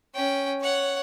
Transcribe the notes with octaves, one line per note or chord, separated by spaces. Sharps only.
C#4 G5
C#5 F#5